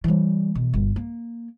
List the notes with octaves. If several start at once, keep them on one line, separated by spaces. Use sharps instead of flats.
E3 G3
B2
G1
A#3